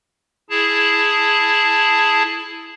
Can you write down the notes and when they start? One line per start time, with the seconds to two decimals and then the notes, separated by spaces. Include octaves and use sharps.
0.50 E4 G#4 A5